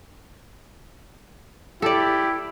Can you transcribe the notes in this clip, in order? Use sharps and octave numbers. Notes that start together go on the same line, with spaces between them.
E4 G4 A4 D5